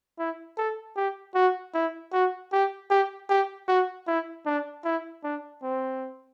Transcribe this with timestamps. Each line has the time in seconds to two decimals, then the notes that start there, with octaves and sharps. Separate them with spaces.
0.19 E4
0.58 A4
0.97 G4
1.35 F#4
1.74 E4
2.13 F#4
2.53 G4
2.90 G4
3.30 G4
3.68 F#4
4.07 E4
4.46 D4
4.85 E4
5.24 D4
5.63 C4